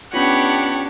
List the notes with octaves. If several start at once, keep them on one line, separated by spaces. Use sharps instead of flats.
B3 C#4 D4 F4 G4 C#5 F#5 B5